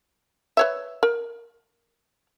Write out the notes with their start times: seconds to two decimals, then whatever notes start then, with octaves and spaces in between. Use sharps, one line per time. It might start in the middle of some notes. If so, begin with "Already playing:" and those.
0.57 B4 C#5 E5
1.03 A#4